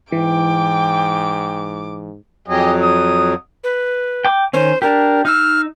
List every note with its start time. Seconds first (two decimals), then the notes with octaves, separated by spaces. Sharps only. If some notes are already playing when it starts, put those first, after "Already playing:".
0.12 G#2 E3 G5 D6
2.48 F2 F#3 G4 G#4 D#5
2.82 D#6
3.64 B4
4.25 G5 D6
4.53 D#3 C#4 C5
4.82 D4 G4 A#4
5.25 D#4 E6 F6